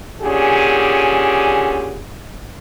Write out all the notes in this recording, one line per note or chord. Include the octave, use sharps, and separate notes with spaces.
A#2 D3 C#4 G4 G#4